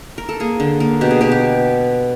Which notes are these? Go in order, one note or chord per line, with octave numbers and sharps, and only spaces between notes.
A#4
A4
A#3 G#4
D3
A#3
B2 G4
G#4
B2 G4
G4